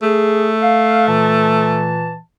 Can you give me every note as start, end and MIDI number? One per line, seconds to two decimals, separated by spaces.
0.02 2.03 57
0.02 0.52 68
0.62 1.06 77
1.07 2.18 46
1.07 2.18 52
1.07 2.18 81